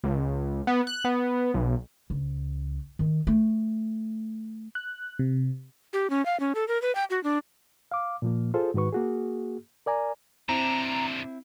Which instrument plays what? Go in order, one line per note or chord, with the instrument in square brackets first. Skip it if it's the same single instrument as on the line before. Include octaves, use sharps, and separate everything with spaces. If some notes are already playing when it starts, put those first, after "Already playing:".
[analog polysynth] C#2
B3
F#6
B3
B1
[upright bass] C#2
D#3
A3
[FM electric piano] F#6
C3
[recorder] G4
C#4
F5
C#4
A4
A#4
B4
G5
F#4
D4
[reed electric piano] F5 D6
A#2 F3 A#3
F4 G#4 A4 C5
G#2 D#3 F#4 B4 C#6
A#3 F#4 G#4
A#4 D5 G#5 A#5
[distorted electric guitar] C3 D4 [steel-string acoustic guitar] C4 E4 [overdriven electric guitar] A#5